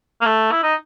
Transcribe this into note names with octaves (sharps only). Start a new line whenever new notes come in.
A#3
A3
E4
D#4